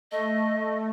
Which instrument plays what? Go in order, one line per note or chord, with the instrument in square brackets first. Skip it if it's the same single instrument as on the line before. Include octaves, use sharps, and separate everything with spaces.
[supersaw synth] A3 [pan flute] D#5